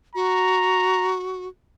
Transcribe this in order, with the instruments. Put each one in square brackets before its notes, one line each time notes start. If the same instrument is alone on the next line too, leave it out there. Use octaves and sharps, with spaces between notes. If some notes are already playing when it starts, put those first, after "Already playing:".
[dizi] F#4 [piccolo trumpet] A#5